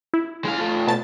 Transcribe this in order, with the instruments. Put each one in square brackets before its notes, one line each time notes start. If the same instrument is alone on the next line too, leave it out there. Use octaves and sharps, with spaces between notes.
[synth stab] E4
[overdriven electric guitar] G#3 F5
A3 F4
[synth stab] B2 A5 A6